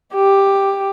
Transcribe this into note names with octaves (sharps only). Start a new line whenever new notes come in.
G4